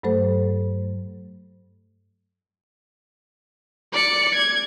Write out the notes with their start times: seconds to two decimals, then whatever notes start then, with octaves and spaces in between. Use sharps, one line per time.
0.03 G2 F#3 A3 A4 C5
3.93 D5 C#7
4.35 G#6